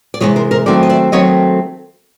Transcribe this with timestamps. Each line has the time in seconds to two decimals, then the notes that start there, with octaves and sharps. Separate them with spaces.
0.14 D5
0.20 C3 E3 G#3 C#5 D#5
0.36 A#4 C5
0.51 A#4 C5
0.66 D#3 F#3 A3 C4 C5 D5
0.83 D#5
0.89 D5 E5
1.12 D#3 F#3 A3 C4 C#5 D#5